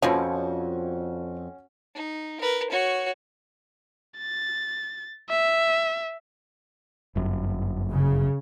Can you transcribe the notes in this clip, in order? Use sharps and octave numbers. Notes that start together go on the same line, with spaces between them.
F2 B2 D3 F3 C#4 F#4 C#5
D#4
A#4 B4
F#4 C#5
A6
E5
G1 F#2
C#3